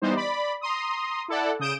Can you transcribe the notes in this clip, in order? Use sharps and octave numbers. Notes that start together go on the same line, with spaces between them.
E3 G3 B3 D#4 C5
D5 B5
A#5 C6 D#6
E4 A4 D5 F#5
C#3 D#6 G6 D7 E7